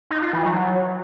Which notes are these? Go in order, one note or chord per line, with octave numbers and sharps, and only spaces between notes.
D#4
F4
E3
F#3